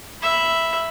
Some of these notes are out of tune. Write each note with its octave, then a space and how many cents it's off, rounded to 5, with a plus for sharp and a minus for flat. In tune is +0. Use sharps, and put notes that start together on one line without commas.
E5 +0 B5 +0